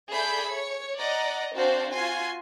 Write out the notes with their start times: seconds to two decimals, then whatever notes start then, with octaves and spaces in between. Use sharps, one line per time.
0.11 G#4 A4 D5 E5 B5 G6
0.50 C#5 C#7
0.98 D5 D#5 F#5 A#5
1.54 C4 D4 F#4 C5 F5
1.91 F4 F#4 G#5 C6